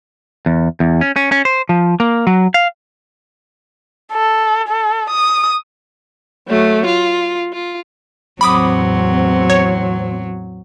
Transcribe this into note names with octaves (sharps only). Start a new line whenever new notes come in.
E2
E2
C#4
C#4
C#4
C5
F3
A#3
F#3
F5
A4
A4
D#6
F#3 A3
F4
F4
E2 A2 F#3 C4 B5 D6 D#6
C#5